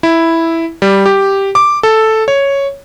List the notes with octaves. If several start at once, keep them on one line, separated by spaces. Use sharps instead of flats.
E4
G3
G4
D6
A4
C#5